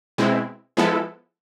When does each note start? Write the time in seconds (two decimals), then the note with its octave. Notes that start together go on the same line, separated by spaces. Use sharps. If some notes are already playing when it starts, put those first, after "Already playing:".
0.18 B2 G#3 C4 E4
0.77 F3 G#3 B3 E4 A4